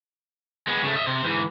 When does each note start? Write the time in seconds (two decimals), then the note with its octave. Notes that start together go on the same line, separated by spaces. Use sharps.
0.67 G#3 B3
0.83 C#3 A3
0.96 D#5 E5
1.07 C3 C5
1.24 G#2 E3